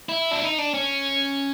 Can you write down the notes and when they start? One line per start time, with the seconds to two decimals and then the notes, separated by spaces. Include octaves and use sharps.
0.09 E4
0.31 D4
0.41 D#4
0.58 D4
0.74 C#4